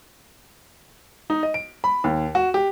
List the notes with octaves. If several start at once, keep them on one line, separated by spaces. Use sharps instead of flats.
D#4
D#5
D7
B5
D#2
F#4
G4